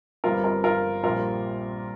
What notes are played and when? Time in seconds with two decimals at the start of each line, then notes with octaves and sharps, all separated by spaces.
0.24 G1 G2 G3 C4 F4 A#4
0.44 F4 A#4
0.64 F4 A#4
1.03 A#1 A#2 G3 C4 F4 A#4